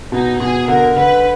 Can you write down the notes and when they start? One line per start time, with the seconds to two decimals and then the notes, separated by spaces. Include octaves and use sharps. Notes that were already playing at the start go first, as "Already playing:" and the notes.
0.12 B2 D#4
0.40 B2 G#4
0.68 D3 A#4
0.96 D3 B4